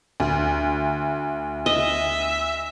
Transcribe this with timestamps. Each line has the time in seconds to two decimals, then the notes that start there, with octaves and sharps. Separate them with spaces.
0.20 D2
1.66 D#5 E5